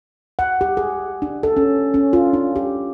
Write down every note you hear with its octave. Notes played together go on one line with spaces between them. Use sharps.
F#5
G4
G#4
D4
A4
C#4
C#4
F4
D4
G4